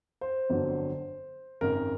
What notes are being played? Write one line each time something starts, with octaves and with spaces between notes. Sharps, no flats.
C5
G1 F2 D3 F#3
G#1 F#2 C#3 A#4